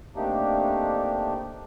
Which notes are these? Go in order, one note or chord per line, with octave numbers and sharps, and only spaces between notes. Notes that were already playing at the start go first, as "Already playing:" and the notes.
C3 A3 A#3 D4 D#4 G4